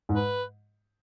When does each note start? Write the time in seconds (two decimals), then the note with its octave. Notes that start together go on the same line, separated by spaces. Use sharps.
0.09 G#2
0.16 B4